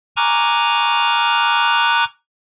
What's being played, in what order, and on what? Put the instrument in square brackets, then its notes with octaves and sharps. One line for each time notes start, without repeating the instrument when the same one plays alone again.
[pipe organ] G#5 A#5 C#6 D6 F6 F#6